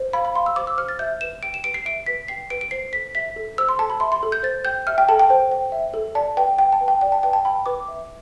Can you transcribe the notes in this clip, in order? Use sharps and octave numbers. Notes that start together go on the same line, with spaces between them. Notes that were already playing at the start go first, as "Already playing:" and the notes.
Already playing: C5
F5 B5
B5
F5 C6
E6
C5 D6
E6
C5 F6
A6
E5 G6
B4 E7
G5 D7
E7
B4 D7
C7
E5 D7
B4 B6
G5 C7
B4 D7
D7
C5 C7
A4 B6
E5 B6
A4
C5 E6
C6
A4 A5
B5
E5 C6
C6
A4
G6
C5 A6
G5 G6
E5 F6
G5
A4 A5
G5
C5
G5
E5
A4
D5 A5
B4 G5
G5
A5
B4
G5
D5 G5
A5
B4 G5
A5
G5 B5
B4 D6
E5